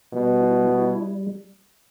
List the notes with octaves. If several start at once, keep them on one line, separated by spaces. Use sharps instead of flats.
B2 G3
E4
G3